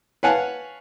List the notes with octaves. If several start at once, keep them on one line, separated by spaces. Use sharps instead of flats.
B4 C#5 F5 F#5 G#5 A5